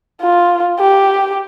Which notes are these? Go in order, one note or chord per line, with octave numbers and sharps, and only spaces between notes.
F4
G4